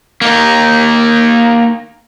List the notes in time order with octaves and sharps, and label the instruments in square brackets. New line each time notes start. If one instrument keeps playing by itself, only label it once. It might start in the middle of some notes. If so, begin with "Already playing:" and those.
[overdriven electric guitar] A#3 D#4